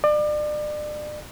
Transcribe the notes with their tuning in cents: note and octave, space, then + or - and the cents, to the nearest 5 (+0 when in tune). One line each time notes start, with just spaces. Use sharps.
D5 +35